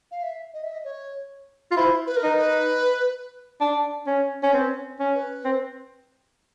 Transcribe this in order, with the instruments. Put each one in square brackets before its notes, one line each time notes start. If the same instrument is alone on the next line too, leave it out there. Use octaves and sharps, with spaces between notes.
[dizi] F5
E5
D#5
E5
D#5
C#5
[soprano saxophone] F4
[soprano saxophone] E4 [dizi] C5
[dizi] B4
A#4
[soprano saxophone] D#4 [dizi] B4
[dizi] B4
[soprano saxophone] D4
C#4
C#4
[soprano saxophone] C4 [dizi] B4
[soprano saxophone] C#4
[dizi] B4
[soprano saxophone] C4